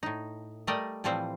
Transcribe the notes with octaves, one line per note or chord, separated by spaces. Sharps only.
A2 D#4
G3 A3 A#4 D5 D#5 G5
A2 E3 F3 G3 C4 C5